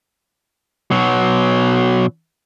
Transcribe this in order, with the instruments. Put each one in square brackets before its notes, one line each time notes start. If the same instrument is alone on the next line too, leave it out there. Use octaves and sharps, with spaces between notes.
[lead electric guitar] B2 F#3